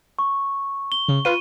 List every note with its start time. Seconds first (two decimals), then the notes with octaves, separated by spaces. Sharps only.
0.19 C#6
0.92 G7
1.08 C#3
1.25 F4 B4 D#7